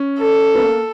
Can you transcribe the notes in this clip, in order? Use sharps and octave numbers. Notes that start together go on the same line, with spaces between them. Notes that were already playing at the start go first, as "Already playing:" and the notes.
Already playing: C#4
A4
B3
A#3